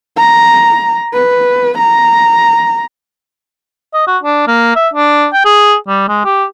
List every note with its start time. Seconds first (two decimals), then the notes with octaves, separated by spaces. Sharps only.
0.18 A#5
1.14 B4
1.79 A#5
3.94 D#5
4.07 F#4
4.23 D4
4.48 A#3
4.76 E5
4.94 D4
5.33 G5
5.45 G#4
5.88 G3
6.09 G#3
6.25 G4